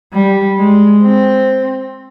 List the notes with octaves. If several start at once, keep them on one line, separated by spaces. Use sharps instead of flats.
G3
G#3
C4